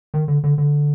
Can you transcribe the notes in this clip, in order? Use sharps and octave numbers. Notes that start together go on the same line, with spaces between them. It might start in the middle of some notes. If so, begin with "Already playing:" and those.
D#3
D3
D3
D3